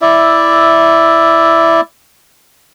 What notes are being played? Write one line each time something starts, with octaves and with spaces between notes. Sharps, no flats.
E4 D5 E5